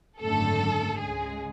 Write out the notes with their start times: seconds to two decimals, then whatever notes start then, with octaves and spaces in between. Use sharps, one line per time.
0.20 G#1 F#2 D3 A3 A4
0.98 C#2 C#3 G#3 G#4